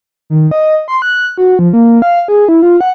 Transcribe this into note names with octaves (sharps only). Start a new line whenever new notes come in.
D#3
D#5
C6
F#6
F#4
F3
A#3
F5
G#4
E4
F4
F#5